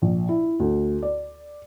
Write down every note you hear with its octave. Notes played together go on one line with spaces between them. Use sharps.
A#1
E4
D2
D5